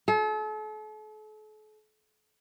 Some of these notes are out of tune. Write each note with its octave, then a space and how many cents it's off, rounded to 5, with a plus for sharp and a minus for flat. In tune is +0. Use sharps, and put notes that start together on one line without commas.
A4 -40